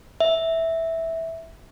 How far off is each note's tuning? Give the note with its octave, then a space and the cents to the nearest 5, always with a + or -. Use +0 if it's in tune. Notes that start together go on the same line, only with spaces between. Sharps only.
E5 -10